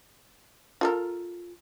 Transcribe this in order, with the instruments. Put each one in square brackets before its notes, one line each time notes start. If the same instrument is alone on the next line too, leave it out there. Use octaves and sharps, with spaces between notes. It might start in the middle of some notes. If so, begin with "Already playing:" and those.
[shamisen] F4 A4 A#4